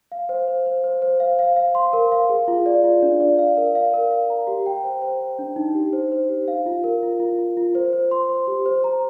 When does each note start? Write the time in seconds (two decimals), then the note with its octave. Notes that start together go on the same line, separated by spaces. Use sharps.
0.12 F5
0.29 C5
0.48 C5
0.66 C5
0.84 C5
1.02 C5
1.20 F5
1.39 F5
1.56 F5
1.75 C6
1.93 A#4
2.12 F5
2.29 G#4
2.48 F4
2.66 D5
2.84 F4
3.02 D4
3.20 D5
3.39 F5
3.57 A#4
3.75 F5
3.94 A#4
4.11 F5
4.30 A#5
4.47 G4
4.66 G5
4.84 C5
5.02 C5
5.20 G5
5.39 D4
5.56 D#4
5.75 G4
5.93 C5
6.12 C5
6.29 G4
6.48 F5
6.66 F4
6.84 A#4
7.03 F4
7.20 F4
7.38 F4
7.57 F4
7.75 C5
7.93 C5
8.11 C6
8.29 C5
8.47 G4
8.66 C5
8.84 A#5